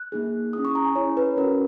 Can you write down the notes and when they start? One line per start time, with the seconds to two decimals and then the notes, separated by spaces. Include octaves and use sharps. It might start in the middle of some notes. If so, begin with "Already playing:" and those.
Already playing: F#6
0.12 A#3 D#4 G#4
0.53 C#4 E4 G#4 D#6
0.65 C#6
0.75 A#5
0.85 G#5
0.95 C#4 E4 G#4 C#5
1.17 B4
1.37 C#4 F#4 A#4